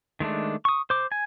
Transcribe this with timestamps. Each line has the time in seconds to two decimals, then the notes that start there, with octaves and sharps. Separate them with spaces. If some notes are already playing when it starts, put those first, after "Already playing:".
0.20 D#3 G#3 A3 D4
0.65 C#6 D#6
0.90 C5 D6
1.12 G#5